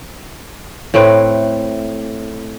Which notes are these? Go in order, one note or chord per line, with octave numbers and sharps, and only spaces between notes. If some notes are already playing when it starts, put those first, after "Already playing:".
A2 A3 C4 B4